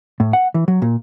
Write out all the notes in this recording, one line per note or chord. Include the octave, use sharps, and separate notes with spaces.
A2
F#5
E3
F#3
A#2